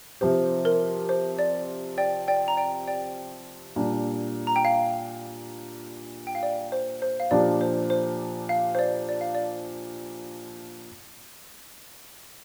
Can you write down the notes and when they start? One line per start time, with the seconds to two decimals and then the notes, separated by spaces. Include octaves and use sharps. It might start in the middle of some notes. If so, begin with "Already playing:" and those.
0.21 C3 F3 C4 G4 C5
0.65 A#4
1.09 C5
1.39 D5
1.98 D5 G5
2.28 D5 G5
2.48 A#5
2.57 D5 G5
2.88 D5 G5
3.76 A#2 G3 D4
4.47 A#5
4.56 G5
4.65 F5
6.27 G5
6.35 F5
6.43 D5
6.72 C5
7.02 C5
7.20 F5
7.31 A#2 F3 D4 G4 D5
7.61 C5
7.90 C5
8.49 F5
8.75 C5
8.79 D5
9.09 D5
9.21 F5
9.35 D5